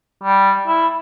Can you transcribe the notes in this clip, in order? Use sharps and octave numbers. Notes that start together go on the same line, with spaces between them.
G3
E4